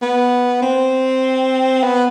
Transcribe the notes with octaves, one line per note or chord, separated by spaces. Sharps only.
B3
C4
B3